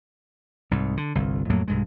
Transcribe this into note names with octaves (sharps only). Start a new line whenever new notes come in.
C2 G#2
D3
G1 C2
F2 A2 F#3 A#3
B1 G2 G#3